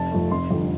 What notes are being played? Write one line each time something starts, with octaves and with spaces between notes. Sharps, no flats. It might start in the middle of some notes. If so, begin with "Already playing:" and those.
Already playing: F1 A5
F2 F3 A3
F1 C6
F2 D3 G3